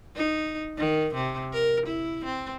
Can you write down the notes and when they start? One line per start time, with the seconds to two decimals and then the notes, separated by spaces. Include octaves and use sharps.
0.16 D#4
0.78 D#3
1.14 C3
1.53 A#4
1.86 E4
2.25 C4